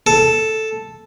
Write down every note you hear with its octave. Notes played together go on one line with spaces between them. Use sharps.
A4